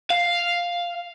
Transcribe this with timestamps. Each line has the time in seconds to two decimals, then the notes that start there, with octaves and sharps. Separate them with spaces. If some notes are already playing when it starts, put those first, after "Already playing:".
0.10 F5